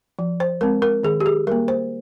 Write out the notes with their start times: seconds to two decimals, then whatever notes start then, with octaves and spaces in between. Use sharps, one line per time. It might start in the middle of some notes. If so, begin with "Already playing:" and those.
0.19 F3
0.40 C5
0.61 G#3 C4 A#4
0.82 A#4
1.03 D#3 G#4
1.20 G4
1.26 G#4
1.47 G3 A#3 A#4
1.68 C5